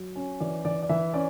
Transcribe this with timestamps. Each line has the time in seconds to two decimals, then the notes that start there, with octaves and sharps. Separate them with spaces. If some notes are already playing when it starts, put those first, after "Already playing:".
Already playing: F#3
0.16 C#4
0.40 E3 D5
0.65 E3 D5
0.83 D5
0.89 E3 E5
1.14 C#4 D5